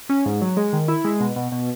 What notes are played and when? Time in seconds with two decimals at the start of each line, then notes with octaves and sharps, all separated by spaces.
0.09 C#4
0.26 G#2
0.42 F#3
0.57 G#3
0.73 D#3
0.88 E4
1.05 G#3
1.20 B2
1.36 B2
1.52 B2